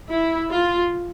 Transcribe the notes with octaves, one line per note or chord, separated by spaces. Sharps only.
E4
F4